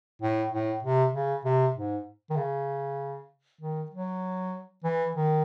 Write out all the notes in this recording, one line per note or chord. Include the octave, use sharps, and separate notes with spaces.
A2
A2
C3
C#3
C3
G#2
D#3
C#3
D#3
F#3
E3
D#3